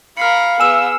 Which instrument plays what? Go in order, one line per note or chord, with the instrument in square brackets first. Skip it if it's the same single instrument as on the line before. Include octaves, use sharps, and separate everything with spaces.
[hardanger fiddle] A#4 B5 [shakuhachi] F5 [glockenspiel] F6 C7 C#7
[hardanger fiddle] B3 G#4 [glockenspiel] G#5 E7 [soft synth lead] E6